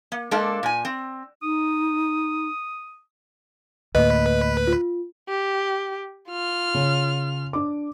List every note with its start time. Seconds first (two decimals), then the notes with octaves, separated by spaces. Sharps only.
0.12 A#3
0.31 G#3 A#3 D4 A4 F5
0.63 A#2 G#5
0.85 C4
1.43 D#4 D#6
3.95 D2 A2 A#3 B4 D#5
4.67 F4
5.29 G4
6.29 F4 F6
6.74 C#3
7.53 D4 D6